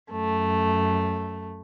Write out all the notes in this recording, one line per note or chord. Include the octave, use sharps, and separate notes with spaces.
F#2 A3